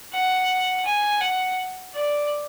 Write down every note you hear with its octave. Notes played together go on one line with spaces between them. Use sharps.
F#5
G#5
F#5
D5